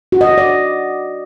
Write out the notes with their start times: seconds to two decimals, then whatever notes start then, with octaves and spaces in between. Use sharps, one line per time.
0.12 F#4
0.21 D#5
0.29 F#4
0.38 D5